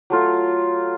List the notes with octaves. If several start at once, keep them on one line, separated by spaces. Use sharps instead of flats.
F#3 A3 F4